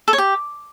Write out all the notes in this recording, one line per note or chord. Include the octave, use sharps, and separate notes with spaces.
A4
C#5
G4